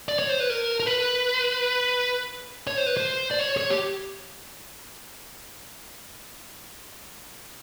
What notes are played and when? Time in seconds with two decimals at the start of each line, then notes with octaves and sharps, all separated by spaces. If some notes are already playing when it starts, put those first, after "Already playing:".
0.09 D5
0.19 C#5
0.29 C5
0.40 B4
0.50 A#4
0.80 A#4
0.86 B4
2.67 C#5
2.77 C5
2.86 B4
2.97 C5
3.31 D5
3.39 C#5
3.57 C#5
3.70 G4